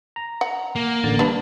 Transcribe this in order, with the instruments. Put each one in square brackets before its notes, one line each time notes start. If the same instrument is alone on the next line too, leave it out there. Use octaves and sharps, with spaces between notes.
[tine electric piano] A#5
[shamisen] F#5
[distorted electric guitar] A#3
[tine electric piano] A1 D3 A6
[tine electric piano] G3 [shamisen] B3 D4